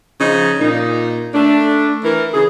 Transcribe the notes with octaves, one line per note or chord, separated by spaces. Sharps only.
C#3 F3 D#4
A#2 D#4
A3 D4
E3 A#4
C#3 E3 G#4